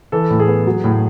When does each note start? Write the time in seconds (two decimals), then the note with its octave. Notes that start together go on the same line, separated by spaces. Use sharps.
0.12 E3 A4
0.30 A2
0.39 G#4
0.48 B3
0.67 F#3
0.84 A2